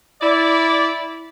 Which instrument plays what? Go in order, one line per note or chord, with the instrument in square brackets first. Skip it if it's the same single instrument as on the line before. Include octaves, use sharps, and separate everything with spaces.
[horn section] E4 D5